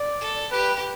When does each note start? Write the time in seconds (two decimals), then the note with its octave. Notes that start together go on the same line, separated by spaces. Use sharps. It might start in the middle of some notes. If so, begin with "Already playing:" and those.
Already playing: D5
0.21 A4
0.51 G4 B4